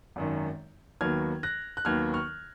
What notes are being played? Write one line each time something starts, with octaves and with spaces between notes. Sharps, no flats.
G#1 F#2 D#3
D#2 D#3 F#3 B3 F6 G#6
F#6 A#6
F#6
D#2 D#3 F#3 B3 F6 G#6
C#6 F6